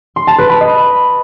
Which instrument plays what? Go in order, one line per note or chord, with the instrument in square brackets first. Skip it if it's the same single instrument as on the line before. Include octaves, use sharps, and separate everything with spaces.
[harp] C6
A5
B4
B5
D#5